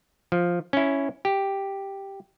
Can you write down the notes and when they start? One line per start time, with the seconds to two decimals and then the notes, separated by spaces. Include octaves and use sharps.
0.32 F3
0.73 C#4 E4
1.25 G4